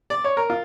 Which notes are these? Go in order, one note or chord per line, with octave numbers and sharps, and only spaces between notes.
D5
C#5
A#4
F4